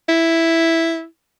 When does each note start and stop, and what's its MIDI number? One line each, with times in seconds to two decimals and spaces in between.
0.09 1.04 64